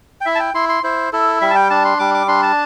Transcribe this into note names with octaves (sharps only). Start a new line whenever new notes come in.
G5
E4 E5
A5
G5
E4 C6
C6
E4 C5
E4 A4
G3 E5
A5
G5
D4 A5
C6
G3 D6
D6
D4 C6
A5